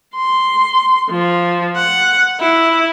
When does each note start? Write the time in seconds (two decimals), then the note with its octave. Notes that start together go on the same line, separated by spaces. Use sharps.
0.15 C6
1.10 F3
1.76 F#5
2.40 E4